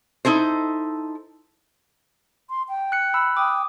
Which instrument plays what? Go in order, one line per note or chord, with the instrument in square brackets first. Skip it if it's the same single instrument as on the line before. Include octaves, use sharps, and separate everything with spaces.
[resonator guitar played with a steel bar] D#4 E4 A4 C5
[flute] C6
G5
[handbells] F#6 C#7
B5 E6 F#6
[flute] G5 [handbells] D6 D#6